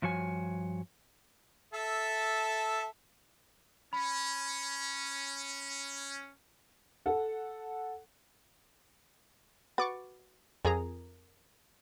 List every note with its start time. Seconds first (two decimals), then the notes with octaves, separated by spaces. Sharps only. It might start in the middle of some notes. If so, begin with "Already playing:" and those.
0.02 G2 F3 F#4 C#5 G#5
1.74 A4 E5 A5
3.93 C#4 B5
7.06 A4 F#5
9.78 F#4 B4 C#6 D6 A6
10.65 F2 G#4 A#4 G#5 A#5